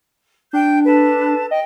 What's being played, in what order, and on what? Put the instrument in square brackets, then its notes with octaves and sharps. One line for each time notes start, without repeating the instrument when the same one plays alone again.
[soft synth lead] D4 [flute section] G5 G6
[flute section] A4 B4 A5
[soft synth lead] D#5 [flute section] G5